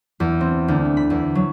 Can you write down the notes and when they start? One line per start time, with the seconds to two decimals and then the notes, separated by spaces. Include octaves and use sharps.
0.20 E2
0.41 C4
0.68 D2
0.85 B3
0.97 B5
1.10 E2
1.35 F#3